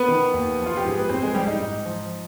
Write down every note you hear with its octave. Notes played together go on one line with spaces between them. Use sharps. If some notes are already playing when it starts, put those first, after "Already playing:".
Already playing: B3 B4
D#3
D#2
F3
F4
G4
G#2 G#4
B4
G#2 C4 C5
G#3 G#4
G#2 G3 G4
D#4
G#2
F3